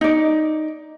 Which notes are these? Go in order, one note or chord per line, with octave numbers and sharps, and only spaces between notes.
D#4 D5